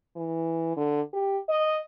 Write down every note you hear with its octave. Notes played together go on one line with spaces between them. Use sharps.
E3
D3
G4
D#5